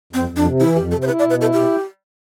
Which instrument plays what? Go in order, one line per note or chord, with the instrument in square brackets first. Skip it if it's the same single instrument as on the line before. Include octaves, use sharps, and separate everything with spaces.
[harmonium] F2 [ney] C4
[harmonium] F2
[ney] D4
[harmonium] C3
[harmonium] E3 [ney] E4
[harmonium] F2 [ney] G4
[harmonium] C3 [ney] A4
[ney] C5
[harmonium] E4 [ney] B4
[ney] D5
[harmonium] B2
[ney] B4
[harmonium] E4 [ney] A4
[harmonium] B2 [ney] G4